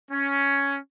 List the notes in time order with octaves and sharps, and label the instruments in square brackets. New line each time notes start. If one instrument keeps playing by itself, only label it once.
[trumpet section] C#4